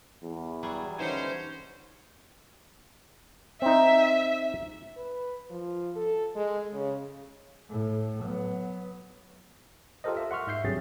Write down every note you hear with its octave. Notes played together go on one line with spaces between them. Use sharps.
E2
F#3 G3 G#4
D3 E3 C#4 D#4 C5
C4 D#4 E5
B4
F3
A4
G#3
C#3
A2
F#3 B3
F4 G4 A4 A#4 C5 D#5
E5
F#5 C6 C#6 F6
G#2 E5 G6 C7
G#1 G2 C3 F#3 G#4 A6